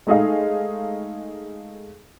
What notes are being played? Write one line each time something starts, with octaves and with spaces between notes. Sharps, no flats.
G#3 A3 D#4 G#4 D#5 F5